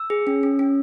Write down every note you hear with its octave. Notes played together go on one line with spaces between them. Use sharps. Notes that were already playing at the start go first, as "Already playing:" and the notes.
Already playing: E6
G#4
C#4
C#4
C#4